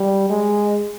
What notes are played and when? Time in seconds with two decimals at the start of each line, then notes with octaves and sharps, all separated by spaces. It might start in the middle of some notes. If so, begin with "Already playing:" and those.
Already playing: G3
0.30 G#3